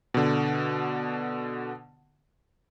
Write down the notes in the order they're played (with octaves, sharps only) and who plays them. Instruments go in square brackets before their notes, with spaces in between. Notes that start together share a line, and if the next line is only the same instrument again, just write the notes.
[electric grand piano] B2 D3